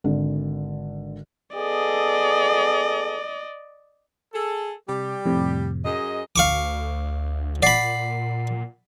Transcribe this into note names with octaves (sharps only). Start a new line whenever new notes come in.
G#1 D3
B3 G#4 A4 D5 D#5
G#4 A4
C3 G3 G4
F2 A2 C3
F#2 G#4 D#5
D2 F5 C#6 D6
A#2 D5 F#5 B5 C7